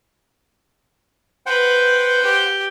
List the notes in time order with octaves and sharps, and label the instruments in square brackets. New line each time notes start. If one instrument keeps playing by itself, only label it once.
[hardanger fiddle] B4 [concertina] C5 F#5 G5
[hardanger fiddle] G4